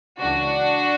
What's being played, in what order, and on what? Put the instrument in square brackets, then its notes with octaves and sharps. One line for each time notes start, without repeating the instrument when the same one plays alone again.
[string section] C#2 C#3 E3 D4 F#4